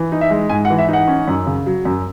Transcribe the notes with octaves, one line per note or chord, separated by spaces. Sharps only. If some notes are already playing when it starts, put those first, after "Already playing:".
Already playing: E3
D#4
E5
G#3
G#2 G#5
F#5
E3
E5
D#4 F#5
C#4
F#2
C#3
F#3
F#2